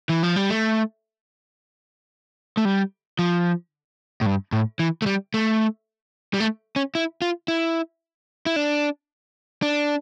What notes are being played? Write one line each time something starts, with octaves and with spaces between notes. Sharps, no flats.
E3
F3
G3
A3
A3
G3
F3
A2
G2
A2
E3
A3
G3
A3
G3
A3
C#4
E4
F4
E4
E4
D4
D4